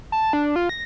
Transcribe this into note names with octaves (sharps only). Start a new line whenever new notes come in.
A5
D4
F4
A#6